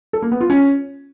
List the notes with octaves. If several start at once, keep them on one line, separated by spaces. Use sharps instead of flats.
A4
A#3
B3
F4
C#4